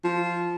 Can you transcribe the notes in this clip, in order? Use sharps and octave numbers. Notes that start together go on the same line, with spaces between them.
F3